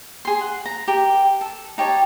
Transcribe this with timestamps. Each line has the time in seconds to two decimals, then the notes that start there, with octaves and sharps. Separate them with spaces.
0.25 G#4 C6
0.41 F#5
0.66 A#5
0.88 G4 A#4
1.41 A4
1.78 D#4 G4 C#5 A5